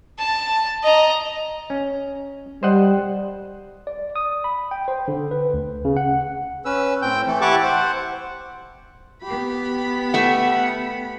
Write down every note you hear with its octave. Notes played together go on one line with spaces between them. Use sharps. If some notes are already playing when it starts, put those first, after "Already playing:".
A5
D#5 A#5
C#4
G3 C5 D#5 F#5
D5
D#6
B5
G5
C5
D3
B4
D2
C#3
F#5
C#4 B4 E6
A2 C4 G5 G6
E3 A3 A4
E4 G4 F#5 A5 C#6 D6
C5 F#5
B3 G4 B5
A3 E5 F#5